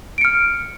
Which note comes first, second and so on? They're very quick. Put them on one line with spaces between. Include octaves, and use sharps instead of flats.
D7 C#7 F6